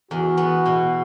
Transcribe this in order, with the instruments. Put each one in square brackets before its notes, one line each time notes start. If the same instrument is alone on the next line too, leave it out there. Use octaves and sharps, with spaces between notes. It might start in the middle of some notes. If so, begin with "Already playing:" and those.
[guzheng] E2 [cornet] F#4
[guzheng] B3
B2